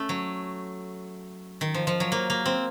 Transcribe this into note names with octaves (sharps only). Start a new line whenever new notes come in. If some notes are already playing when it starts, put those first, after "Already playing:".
Already playing: A3 C#4
F#3
D#3
F3
F3
F#3
A#3
A#3
C4